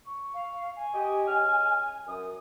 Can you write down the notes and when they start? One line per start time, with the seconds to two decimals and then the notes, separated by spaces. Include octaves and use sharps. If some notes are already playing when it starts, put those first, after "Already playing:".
0.07 C#6
0.34 F5
0.76 G#5
0.94 G4 D#5
1.28 C#3 D#5 F6
2.07 F#2 D#6